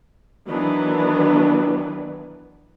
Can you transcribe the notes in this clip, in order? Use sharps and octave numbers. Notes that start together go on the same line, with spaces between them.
D#3 E3 F#3 B3 D4 B4